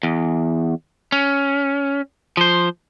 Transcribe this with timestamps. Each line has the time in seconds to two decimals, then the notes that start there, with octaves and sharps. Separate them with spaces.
0.03 E2
1.12 C#4
2.37 F3 C5